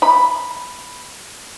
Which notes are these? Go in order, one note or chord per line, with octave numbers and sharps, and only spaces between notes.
B5